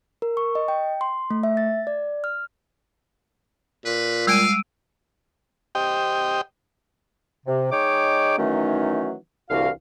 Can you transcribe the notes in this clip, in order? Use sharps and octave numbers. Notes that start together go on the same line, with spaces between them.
A#4
C#6
D#5
G5
C6
A3
E5
A6
D5
F6
A#2 B4
G3 G#3 F5 G#5 E6 D7 D#7
G4 C5 D#5 G5
C3
G#3 D#4 C#5 G5 D6
D#3 E3 F#3 A3 C#4 D#4
C2 D3 E3 F#4 F5